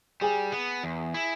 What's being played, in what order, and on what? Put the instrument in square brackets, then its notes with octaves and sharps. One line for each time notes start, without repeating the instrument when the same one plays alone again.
[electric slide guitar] G3 [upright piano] G#4
[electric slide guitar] B3
E2
E4